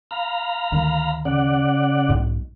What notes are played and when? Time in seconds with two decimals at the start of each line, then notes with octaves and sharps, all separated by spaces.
0.11 F5 A#5 B5
0.72 D2 D#3
1.25 C#3 D5 F#5
2.09 B1 G#2